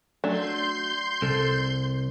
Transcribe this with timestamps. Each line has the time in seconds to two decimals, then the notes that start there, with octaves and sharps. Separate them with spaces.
0.24 F#3 A3 D4 C6 G6
1.22 C2 A4